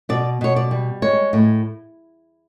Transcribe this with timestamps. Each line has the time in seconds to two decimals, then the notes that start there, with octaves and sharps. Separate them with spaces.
0.09 B2 D5
0.41 B2 C#5
0.56 D5
0.71 G3
1.02 G#3 C#5
1.33 A2